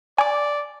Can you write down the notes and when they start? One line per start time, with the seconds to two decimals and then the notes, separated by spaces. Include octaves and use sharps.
0.18 D5 G#5 D6